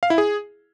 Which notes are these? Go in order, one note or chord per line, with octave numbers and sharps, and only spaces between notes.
F5
E4
G#4